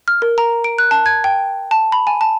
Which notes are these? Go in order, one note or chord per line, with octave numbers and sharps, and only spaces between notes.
F6
A#4
A#5
D7
F#6
A5
G#6
G5
A5
B5
G#5
A5